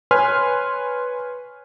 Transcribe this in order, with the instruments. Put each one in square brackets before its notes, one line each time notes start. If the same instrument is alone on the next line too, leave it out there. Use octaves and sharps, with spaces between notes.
[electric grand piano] B4 C#5 G#5 C6 F6